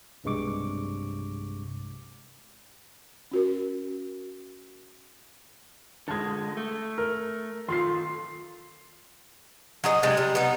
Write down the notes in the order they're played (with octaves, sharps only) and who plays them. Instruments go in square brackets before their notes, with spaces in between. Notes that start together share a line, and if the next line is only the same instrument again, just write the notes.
[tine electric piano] B1 G2 C3 G#3 C#6 D6
[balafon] C#4 F#4 A#4
[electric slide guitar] D3 G#3 [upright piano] A5 G#6
[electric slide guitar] A3
[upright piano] A#4
[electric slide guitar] D#3 F4 A4 [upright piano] C6 C7
[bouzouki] F#3 G#4 D#5
C3 G3 G#3 D4
G3
B3 D#4